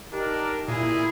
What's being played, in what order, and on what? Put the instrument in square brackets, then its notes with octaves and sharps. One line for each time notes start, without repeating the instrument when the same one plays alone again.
[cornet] D4 [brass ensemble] D#4 G4 A#4
[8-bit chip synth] A#2 [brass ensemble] E4 [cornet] G#4